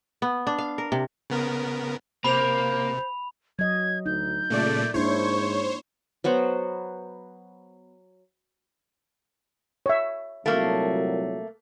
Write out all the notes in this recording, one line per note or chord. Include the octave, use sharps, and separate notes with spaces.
B3
D4
F5
A#4
C3
C#3 B3 A#4
C3 A#3 C5 B5 F7
F#3 D#5 G#6
D2 D#4 G6
A#2 C#3 A3 D5
G#2 A#3 D4 E4 C5 C#5 C#6
F#3 B3 C5 F#5
C#5 E5
C2 A#2 F#3 A3 A#3